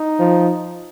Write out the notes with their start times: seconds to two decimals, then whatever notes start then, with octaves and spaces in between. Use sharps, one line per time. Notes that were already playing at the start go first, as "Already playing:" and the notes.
Already playing: D#4
0.19 F3